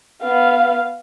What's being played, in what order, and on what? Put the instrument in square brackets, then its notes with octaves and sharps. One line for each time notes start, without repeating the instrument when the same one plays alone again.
[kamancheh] B3 F5